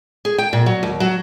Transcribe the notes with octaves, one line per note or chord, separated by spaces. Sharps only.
G#4
G5
A#2
F#3
D#2
F#3